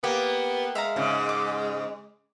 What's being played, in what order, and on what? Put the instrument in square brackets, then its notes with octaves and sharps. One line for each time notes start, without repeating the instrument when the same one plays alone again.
[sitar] A#3 [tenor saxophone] B3 [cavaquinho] G4
[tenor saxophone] G#3 [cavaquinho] E5 F5 A#5
[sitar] G#2 C#3
[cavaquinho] D6